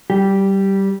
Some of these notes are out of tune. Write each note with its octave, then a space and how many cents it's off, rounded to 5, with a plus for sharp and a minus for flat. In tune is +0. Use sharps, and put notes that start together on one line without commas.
G3 -15 G4 +0